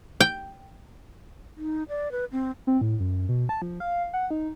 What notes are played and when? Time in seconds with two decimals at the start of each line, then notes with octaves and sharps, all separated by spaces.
0.21 G5
1.57 D#4
1.89 D5
2.12 B4
2.32 C4
2.67 C4
2.81 A2
3.00 F#2
3.29 B2
3.49 A5
3.62 F3
3.80 F5
4.14 F#5
4.31 D#4